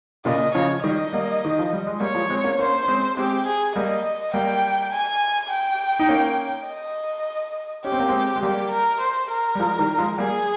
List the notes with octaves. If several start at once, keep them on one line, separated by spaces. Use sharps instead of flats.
A#2 C#3 D#5
C#3 F3 C#5
D#3 G3 D#5
G3 A#3
D#3
F3
G3
G#3
G3 A#3 C#5
F3 G#3
G#3 C4
A#3 C#4
A#3 C#4 C5
C#4
G#3 C4
G#3 C4 G4
G#4
G3 A#3 D#5
G3 A#3 G5
G#5
G5
D#4
A#3 C#4
D#5
C#4 G4
C4
A#3
G#3 C4
G#3
G3 A#3 G4
A#4
C5
A#4
G3
F3 G#3
D#3 G3
F3 G#3
G3 A#3 G#4